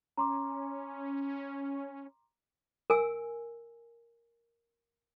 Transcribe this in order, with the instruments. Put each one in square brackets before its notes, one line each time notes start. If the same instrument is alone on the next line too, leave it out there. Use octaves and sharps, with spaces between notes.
[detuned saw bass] C#4 [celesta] A#5 C6 D6
[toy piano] A#4 G#5 E6